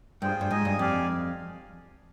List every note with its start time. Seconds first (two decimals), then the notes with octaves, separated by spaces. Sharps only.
0.22 G2 F4 G#4 C5 G5
0.41 G2
0.50 G#2 G#4 D#5 G#5
0.65 G2
0.79 F2 G4 D5 F5 G#5